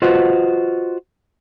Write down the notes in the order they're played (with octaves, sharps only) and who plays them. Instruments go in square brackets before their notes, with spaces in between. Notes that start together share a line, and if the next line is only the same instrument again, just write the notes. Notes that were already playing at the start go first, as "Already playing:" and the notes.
[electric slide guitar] F4 F#4 B4 C5 D#5 F#5